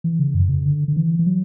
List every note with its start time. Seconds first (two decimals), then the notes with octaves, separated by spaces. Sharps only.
0.04 E3
0.19 C#3
0.35 F#2
0.49 C#3
0.66 D3
0.88 D3
0.96 E3
1.19 E3
1.26 F#3